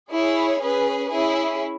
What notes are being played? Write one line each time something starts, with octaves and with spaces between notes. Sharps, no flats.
E4 G#4 C#5
C#4 G#4 B4
C#4 E4 G#4